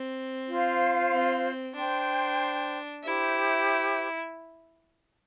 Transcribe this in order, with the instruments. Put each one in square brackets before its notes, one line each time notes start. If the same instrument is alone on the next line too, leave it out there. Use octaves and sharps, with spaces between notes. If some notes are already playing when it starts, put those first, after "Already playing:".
Already playing: [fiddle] C4
[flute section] F4 C5 F5
[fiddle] C4
[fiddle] D4 [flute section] C5 G5 C6
[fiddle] E4 [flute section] G4 C5 E5